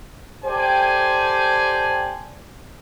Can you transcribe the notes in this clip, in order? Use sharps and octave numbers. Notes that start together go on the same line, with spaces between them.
G4 A4 C5 D5 G5 G#5